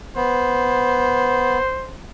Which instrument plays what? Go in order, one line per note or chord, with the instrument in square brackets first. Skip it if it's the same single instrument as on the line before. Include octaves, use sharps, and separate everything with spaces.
[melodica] B3 [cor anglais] C5